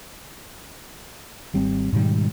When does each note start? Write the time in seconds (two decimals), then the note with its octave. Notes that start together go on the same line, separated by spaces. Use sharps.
1.54 G#1 G3 C4
1.93 G#2 B2 D#3 G3